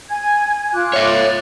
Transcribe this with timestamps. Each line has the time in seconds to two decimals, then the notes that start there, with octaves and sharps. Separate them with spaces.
0.11 G#5 G#6
0.73 F4 D6 F#6
0.93 C#5 E5